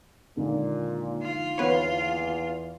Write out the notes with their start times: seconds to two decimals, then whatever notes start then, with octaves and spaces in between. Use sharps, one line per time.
0.37 D#2 A#2 D3 G#3
1.22 F4
1.58 E2 B3 B4 C#5